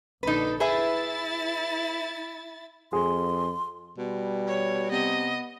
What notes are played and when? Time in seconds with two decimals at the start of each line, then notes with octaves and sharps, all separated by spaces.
0.23 A#1 D3 D#4 A4 B4
0.60 E4 G#4 B4 E5 A6
2.93 F2 G#4 C6
3.98 B2 G3
4.47 C#5
4.91 C3 B3 D#5